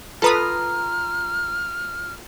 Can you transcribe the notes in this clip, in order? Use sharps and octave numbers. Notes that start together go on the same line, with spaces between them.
F4 A4 B4 A#5 D#6 F6